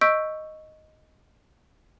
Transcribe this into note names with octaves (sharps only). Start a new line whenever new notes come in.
D#5 C#6 E6 G6 B6 D7